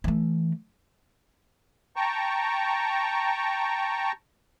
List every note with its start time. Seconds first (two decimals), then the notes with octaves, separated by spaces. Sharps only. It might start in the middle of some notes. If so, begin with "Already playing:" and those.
0.04 E3 A3
1.96 G5 A5 A#5 C#6